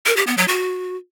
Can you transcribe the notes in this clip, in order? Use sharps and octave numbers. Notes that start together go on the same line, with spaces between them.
A#4
G4
B3
F#3
F#4